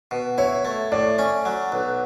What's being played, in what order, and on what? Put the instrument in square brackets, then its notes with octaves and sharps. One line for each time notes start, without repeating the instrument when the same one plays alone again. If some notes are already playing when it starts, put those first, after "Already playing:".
[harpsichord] B2
[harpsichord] E4 [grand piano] C#5
[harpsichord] A3
[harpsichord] A2 [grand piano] D5
[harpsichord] C#4
F#3
B1